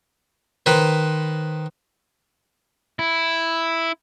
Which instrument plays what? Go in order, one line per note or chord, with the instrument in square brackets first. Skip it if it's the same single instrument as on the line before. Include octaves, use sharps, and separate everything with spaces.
[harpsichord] D#3 B4 C5
[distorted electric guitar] E4